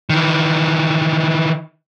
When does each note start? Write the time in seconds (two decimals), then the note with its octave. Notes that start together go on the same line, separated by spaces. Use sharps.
0.10 D#3 E3